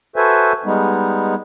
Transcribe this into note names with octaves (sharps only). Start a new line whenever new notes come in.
F#4 A4 B4 C5 E5 G#5
G3 G#3 B3 D#4